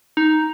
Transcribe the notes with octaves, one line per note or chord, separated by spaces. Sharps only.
D#4